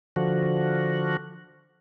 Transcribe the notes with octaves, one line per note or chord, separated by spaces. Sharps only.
D3 F3 F#4